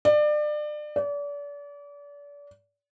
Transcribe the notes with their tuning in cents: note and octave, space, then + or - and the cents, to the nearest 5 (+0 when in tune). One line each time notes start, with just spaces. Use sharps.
D5 +30
D5 -35